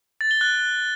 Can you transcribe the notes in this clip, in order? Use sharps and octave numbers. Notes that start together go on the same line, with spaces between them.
A6
G7
F#6